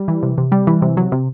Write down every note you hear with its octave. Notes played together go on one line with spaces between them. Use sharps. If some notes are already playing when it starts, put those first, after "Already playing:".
Already playing: G3
E3
C3
C3
G3
E3
C3
F#3
C3